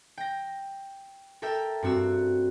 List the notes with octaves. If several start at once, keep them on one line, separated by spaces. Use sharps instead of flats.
G5 A#6
A4 A#4 E5 G5 E6
G2 C4 F#4 E6